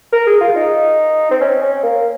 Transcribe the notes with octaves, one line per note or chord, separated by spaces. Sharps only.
A#4
G#4
F4
D#4
C4
C#4
C#4
A#3